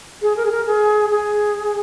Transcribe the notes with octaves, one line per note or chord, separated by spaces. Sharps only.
G#4
A#4
G#4
A#4
G#4
G#4